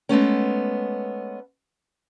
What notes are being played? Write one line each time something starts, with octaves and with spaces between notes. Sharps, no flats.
G#3 A3 B3 C#4